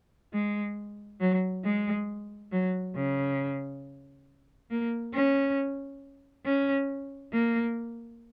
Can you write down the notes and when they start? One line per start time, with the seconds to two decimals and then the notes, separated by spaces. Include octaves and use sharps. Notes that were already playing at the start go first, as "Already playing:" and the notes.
0.34 G#3
1.21 F#3
1.65 G#3
2.52 F#3
2.96 C#3
4.71 A#3
5.14 C#4
6.45 C#4
7.33 A#3